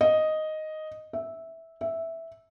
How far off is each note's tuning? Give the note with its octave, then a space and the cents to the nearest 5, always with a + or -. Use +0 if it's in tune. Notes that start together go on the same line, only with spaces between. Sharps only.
D#5 +0
E5 -10
E5 -5